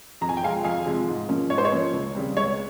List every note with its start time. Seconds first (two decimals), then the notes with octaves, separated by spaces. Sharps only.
0.21 F2 A#5
0.29 G#5
0.37 G5
0.43 C3 F3 G#3 C4 F5 G#5
0.64 F2 F5 G#5
0.85 C3 F3 G#3 C4
1.07 G#2
1.29 F3 A#3 C#4
1.50 G#2 C#5
1.58 C5
1.65 C#5
1.72 F3 A#3 C#4
1.93 C#2
2.15 C#3 G3 C4
2.36 C#2 C#5